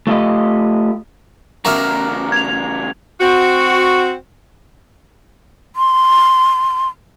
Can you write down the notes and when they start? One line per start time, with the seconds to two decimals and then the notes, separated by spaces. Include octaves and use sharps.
0.07 A3 F4 G4 D#5
1.65 E2 C#3 F#4 A#4 E5 A#5 D6 F6
2.32 G#6 F7
3.21 C4 F#4
5.76 C6